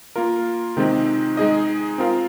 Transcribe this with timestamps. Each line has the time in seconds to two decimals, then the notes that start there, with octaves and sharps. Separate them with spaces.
0.16 A#3 F4 A#4
0.77 C3 D#3 G#3 C4 D#4
1.37 G#3 D#4 G#4 D#5
1.98 C4 F4 A#4 F5